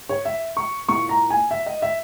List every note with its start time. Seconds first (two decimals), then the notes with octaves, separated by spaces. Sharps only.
0.09 C#5
0.25 E5
0.57 C#6
0.89 A#2 A#3 E4 C#6
1.09 A#5
1.30 G#5
1.51 E5
1.66 D#5
1.82 E5